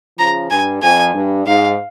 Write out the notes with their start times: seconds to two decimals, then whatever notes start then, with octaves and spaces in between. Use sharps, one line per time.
0.19 C#3 F3 A#5
0.51 G2 G#5
0.82 F2 G#5
1.14 G2
1.46 G#2 F5